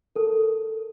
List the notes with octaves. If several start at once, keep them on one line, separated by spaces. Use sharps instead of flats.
A4 A#4